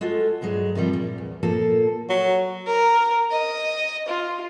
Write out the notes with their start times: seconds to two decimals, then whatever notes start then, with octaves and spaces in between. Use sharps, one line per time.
0.01 G#3 F4 F#4 A4
0.41 D2 G2 F#3 G#3
0.75 C3 D#3 F3 G3
0.93 A#2
1.18 E2
1.43 A#2 F3 A#3 A4
2.09 F#3
2.67 A#4
3.31 D#5
4.08 F4